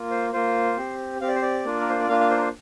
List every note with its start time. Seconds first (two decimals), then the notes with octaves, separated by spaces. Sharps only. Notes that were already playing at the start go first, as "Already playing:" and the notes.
Already playing: A#3 F4
0.11 C5
0.33 A#3 F4 C5
0.77 C4 G4
1.21 C4 G4 F5
1.28 D5
1.35 C5
1.42 D5
1.65 A#3 D4 F4
1.80 A#4
1.89 C5
1.99 D5
2.09 A#3 D4 F4 F5
2.20 F5
2.30 C5
2.37 A#4
2.41 C5